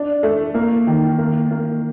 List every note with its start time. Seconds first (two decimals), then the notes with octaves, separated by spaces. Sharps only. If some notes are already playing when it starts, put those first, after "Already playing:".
Already playing: D4
0.23 A3
0.54 A#3
0.87 D#3
1.18 A#3
1.51 A#3